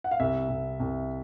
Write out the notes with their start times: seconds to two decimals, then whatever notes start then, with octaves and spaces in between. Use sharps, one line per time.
0.04 F#5
0.11 F5
0.20 C2 E5
0.49 C2
0.80 C2